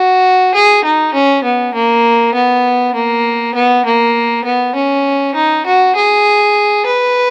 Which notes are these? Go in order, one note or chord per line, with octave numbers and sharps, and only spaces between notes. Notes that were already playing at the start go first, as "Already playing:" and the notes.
Already playing: F#4
G#4
D#4
C#4
B3
A#3
B3
A#3
B3
A#3
B3
C#4
D#4
F#4
G#4
B4